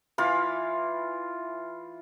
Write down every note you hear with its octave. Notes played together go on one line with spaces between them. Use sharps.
E3 F4 F5 B5